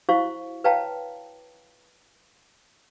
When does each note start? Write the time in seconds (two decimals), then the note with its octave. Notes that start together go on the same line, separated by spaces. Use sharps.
0.09 E4 F#4 C5 F5 C#6
0.64 B4 C#5 F5 G5 A5 A#5